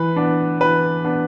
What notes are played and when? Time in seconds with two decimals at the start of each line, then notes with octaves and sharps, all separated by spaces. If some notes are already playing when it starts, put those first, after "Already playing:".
Already playing: E3 B4
0.16 B3 D4
0.61 E3 B4
1.05 B3 D4